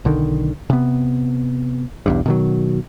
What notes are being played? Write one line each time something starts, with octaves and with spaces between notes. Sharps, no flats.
B1 D3 D#3
C3 B3
B1 E2 G2
B2 D#3 F#3